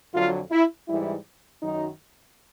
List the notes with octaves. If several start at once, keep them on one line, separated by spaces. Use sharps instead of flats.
F2 D3 F#3 F4
E4
G#2 E3 G3 E4
F#2 D#3 F#3 D#4